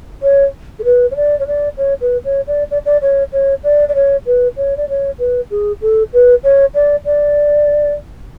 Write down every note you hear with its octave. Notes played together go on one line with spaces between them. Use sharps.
C#5
A4
B4
C#5
D5
C#5
D5
C#5
B4
C#5
D5
D5
D5
C#5
C#5
D5
D5
C#5
B4
C#5
D5
C#5
B4
G#4
A4
B4
C#5
D5
D5